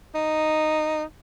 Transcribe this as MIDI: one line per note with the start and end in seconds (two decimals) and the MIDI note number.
0.15 1.04 63